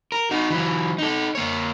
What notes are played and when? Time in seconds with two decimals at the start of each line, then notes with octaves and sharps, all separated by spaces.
0.12 A#4
0.31 D#4 F#4
0.50 E3 F#3
0.98 D#4 A4
1.35 A#3 C#5